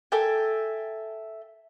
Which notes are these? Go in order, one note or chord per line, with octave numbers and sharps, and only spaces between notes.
A4 E5 G5 G#5